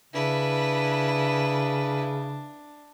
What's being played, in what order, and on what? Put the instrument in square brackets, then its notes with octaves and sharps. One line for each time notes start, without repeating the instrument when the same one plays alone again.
[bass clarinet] C#3 [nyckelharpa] D4 [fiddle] E4 B4